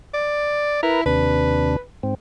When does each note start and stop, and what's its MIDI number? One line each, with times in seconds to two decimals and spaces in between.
0.14 0.81 74
0.83 1.04 64
0.83 1.01 70
0.83 1.01 71
0.83 1.01 82
1.06 1.76 39
1.06 1.76 48
1.06 1.76 62
1.06 1.81 71
2.03 2.14 44
2.03 2.14 60